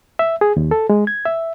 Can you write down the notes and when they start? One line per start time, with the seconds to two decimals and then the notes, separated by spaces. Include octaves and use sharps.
0.19 E5
0.41 G#4
0.56 D#2
0.71 A4
0.90 G#3
1.07 G#6
1.25 E5